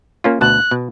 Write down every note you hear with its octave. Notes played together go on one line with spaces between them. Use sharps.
A#3 C#4 F4
D2 B2 A5 F#6
B2